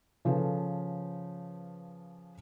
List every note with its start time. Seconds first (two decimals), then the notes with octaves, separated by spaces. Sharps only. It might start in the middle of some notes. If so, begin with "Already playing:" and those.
0.25 C#3 F3 A4 B4